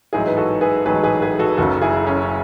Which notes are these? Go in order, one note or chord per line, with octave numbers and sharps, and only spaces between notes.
A1 G#2 F#3 E4 G#4
B4
F#4 A4
G#4 B4
A1 G#2 F#3 G#4 B4
G#4 B4
G#4 B4
F#4 A4
F#1 F#2 C#3 F#3 F#4 A4
E4 G#4
C#4